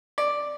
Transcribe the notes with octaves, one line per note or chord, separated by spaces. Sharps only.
D5